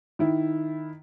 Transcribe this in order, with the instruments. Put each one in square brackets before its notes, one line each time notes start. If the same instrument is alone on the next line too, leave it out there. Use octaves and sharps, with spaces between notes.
[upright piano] D#3 E4